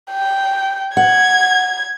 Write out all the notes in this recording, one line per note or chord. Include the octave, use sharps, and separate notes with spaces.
G5
F#5 G#6